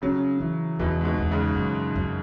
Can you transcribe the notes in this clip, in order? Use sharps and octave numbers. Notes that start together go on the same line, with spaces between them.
C#3 F#3 C#4
E3
E2 B2 E3
G#2
B2
E2
G#2 C#3
F#2
F#2